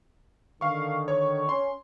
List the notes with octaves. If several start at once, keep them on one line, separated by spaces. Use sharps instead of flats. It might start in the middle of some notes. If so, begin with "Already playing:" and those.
D3 D#3 F5 C#6
C#5 C#6
C#4 C6